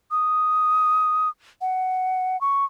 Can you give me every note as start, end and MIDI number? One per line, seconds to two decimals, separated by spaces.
0.11 1.29 87
1.61 2.39 78
2.41 2.65 85